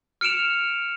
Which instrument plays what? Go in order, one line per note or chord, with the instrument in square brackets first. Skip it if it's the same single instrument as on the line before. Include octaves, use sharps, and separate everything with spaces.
[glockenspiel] F6 C#7 D7 E7 F7